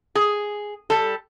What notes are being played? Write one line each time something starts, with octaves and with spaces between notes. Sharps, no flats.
G#4
G3 A4